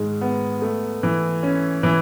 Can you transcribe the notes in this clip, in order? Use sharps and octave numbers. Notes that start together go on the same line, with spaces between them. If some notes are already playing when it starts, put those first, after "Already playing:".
Already playing: G#2 D#3 G#3
B3
A3
E3
C#4
E3